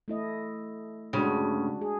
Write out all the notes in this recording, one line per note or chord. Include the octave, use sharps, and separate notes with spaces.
A3 E4 D#5
D2 G2 C#3 G#3 D4 F#4
G#4